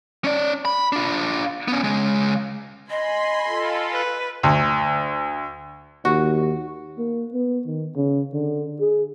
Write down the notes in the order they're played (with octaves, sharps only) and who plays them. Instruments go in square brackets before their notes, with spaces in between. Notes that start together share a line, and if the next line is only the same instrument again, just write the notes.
[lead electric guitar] C#4 D5
B5
D4 F4
B3 C#4
C#3 G#3
[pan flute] D#5 [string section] G#5 B5 C6
[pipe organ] F4 A4
[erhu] B4
[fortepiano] D2
[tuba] D#2 [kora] F#4
[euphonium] A#3
B3
D#3
C#3
D3
G#4